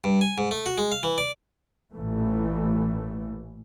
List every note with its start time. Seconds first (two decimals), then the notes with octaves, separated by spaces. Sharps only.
0.04 G2
0.21 G#5
0.38 G#2
0.51 A3
0.66 F#4
0.78 G#3
0.92 F5
1.03 E3
1.18 D5
1.95 A1 A#2 E3 A3